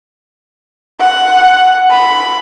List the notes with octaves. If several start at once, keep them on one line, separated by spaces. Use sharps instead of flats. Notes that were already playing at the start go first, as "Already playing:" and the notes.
F#5
B5